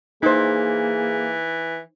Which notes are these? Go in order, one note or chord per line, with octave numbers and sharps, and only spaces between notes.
E3 A#3 D#4 G#4 C5